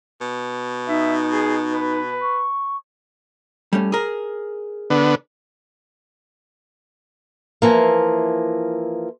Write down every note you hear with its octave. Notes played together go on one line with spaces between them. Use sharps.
B2
D#4 E5
G#4
B4
C#6
G3 A3 C#4
G#4 A#4
D3 B3
E3 F3 A#3